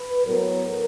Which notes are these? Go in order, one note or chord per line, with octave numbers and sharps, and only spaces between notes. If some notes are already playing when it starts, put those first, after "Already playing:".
Already playing: B4
A2 F#3 B3 A#4